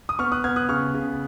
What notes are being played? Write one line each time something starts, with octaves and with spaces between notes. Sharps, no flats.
D#6
B3 C#6 F6
D#6 F#6
B3 F6 G#6
D#6 F#6
C#3 C#6 F6
C#3